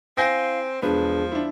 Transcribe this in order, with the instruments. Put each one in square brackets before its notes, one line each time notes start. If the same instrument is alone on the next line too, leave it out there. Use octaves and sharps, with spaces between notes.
[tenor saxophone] C4 [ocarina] E4 [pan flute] F5 [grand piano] G#5 G6 A#6
[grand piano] E1 B4 [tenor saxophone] F3 [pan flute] D4 [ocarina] G#4
[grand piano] D4 E4